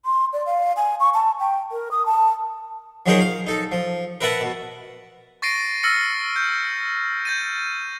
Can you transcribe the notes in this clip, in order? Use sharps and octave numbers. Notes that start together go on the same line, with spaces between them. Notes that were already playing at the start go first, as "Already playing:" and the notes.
C6
D5
F5
G#5
C#6
A5
G5
A#4
D#6
A5
F3 F#3 D#4 G#4 A#4 C5
F5
D#4 A4
F3
A#4 B4 E5 F#5 A5
B2
C#6 A6 A#6 C7 D7 D#7
E6 F6 A6 A#6 C#7
G6
G6 A6 D#7